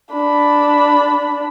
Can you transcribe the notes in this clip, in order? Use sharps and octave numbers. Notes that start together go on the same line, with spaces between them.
D4 B5